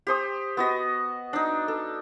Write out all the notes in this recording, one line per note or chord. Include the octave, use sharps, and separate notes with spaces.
G4 C5 D#6
B3 F#4 D#5
D4 D#4
A4